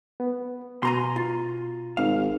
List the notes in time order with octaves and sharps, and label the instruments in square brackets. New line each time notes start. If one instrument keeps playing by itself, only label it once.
[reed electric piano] B3
[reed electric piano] B2 [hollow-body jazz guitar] G#5 A#5 C6
[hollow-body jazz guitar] F4
[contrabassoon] G#1 [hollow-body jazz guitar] F5